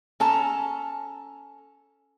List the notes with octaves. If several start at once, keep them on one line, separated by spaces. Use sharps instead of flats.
C#4 A4 A5 A#5